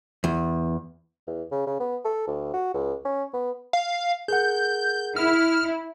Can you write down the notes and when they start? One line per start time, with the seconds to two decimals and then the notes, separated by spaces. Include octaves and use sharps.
0.24 E2
1.27 E2
1.52 C#3
1.67 C#3
1.80 B3
2.05 A4
2.28 D2
2.54 F#4
2.74 C#2
3.05 C#4
3.33 B3
3.73 F5
4.28 G#4 A#4 F#5 G6
5.16 E4 F6